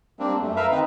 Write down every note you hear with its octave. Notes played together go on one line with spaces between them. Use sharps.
G3 A#3 C4 D4
F#2 A3
A#4 B4 E5 F5
D#3 C4 D#4 B4